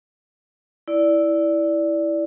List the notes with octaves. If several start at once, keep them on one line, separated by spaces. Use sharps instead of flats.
E4 D5